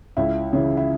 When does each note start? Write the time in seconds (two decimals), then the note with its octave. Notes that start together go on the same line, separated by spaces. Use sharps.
0.17 C#2 E4
0.53 C#3 E3
0.77 E4